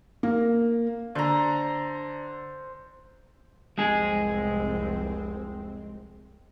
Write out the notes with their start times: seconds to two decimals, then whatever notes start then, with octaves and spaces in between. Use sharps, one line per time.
0.23 A#3
1.15 D3 C5 A#5
3.78 F1 C2 G#3 C4 G#4